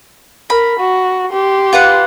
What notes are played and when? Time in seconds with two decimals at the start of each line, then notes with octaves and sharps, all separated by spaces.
0.50 A#4 B5
0.79 F#4
1.32 G4 C6
1.73 F4 B4 F#5